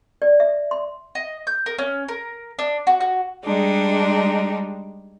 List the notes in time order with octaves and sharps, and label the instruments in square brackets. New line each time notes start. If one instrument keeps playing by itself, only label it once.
[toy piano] D5
E5
C6
[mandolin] D#5
G6
A#4
C#4
A#4
D4
F#4
F#4
[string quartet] G3 G#3 D4 D#4